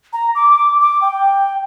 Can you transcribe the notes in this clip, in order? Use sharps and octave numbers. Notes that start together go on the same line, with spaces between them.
A#5
D6
D6
G5